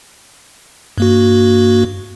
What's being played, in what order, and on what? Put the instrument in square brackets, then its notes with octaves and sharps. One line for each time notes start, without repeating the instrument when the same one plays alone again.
[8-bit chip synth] G2 A#3 F#4